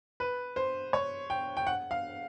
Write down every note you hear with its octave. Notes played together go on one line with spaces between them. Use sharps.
B4
C5
C#5
G5
G5
F#5
F5